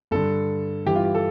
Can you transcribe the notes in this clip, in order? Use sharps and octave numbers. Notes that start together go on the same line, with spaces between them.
G2 D3 A4
G2 E3 G4
F4
G4
A4